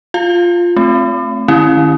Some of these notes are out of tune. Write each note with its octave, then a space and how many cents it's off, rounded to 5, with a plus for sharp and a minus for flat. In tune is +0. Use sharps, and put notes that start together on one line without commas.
F4 +0 F5 +0
A3 +0 C4 +0
D#3 -40 C#4 -25 E4 +0